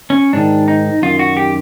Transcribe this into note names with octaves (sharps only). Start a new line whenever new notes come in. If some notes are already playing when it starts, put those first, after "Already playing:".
C#4
G#2 D#3 D4
D#4
F#2 D#3 F4
F#4
G4